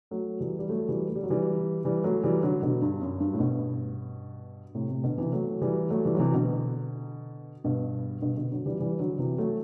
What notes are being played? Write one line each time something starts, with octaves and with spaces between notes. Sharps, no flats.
F#3 A3
E3 G3
G3
F#3 A3
E3 G3
A3
G3
F#3
E3 G3
E3 G3
F#3 A3
E3 G3
D3 F#3
B2 D3
G2
F#2
G2
A2
G2 B2
A2 C3
A2 C3
B2 D3
C3 E3
F#3 A3
E3 G3
F#3 A3
E3 G3
F#3
C3 E3
B2 D3
G2 B2
G2 B2
B2 D3
D3 F#3
E3 G3
E3 G3
D3 F#3
C3 E3
F#3 A3